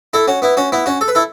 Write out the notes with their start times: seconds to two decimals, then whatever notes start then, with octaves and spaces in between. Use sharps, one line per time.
0.13 E4 A4
0.28 C#4 F#4
0.42 B3 E4
0.57 C#4 F#4
0.72 B3 E4
0.86 C#4 F#4
1.01 A4
1.08 B4
1.15 E4 A4